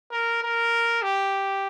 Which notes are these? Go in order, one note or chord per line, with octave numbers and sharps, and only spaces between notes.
A#4
A#4
G4